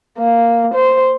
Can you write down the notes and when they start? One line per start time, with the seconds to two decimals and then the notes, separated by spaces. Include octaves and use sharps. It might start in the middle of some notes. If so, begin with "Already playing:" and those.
0.18 A#3
0.74 C5